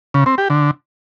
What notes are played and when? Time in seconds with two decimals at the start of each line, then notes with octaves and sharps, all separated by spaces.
0.14 C#3
0.26 C4
0.38 G4
0.50 D3